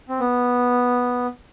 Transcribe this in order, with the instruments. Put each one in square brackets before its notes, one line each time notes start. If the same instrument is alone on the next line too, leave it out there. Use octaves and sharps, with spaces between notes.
[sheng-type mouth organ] C4
B3